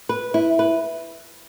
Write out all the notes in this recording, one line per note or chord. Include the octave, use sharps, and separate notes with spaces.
B4
E4
B4